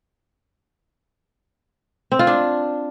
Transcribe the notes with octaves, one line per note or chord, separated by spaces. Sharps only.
C4
F4
D4